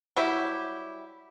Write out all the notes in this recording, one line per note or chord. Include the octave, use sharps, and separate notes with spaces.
F#3 G3 E4 G4